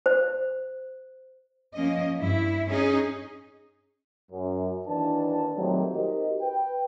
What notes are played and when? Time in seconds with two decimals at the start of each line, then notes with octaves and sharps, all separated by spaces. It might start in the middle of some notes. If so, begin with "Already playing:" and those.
0.06 C5
1.74 F3 A#3 C#4 D#5
2.17 G2 E4
2.67 C#4 D#4 G#4
4.32 F#2
4.87 D#2 E3 D4 B4 A5
5.55 A#2 D#3 F#3 G3 A3 C4
5.95 D#4 F#4 G4 A#4 C5 D#5
6.42 B4 G5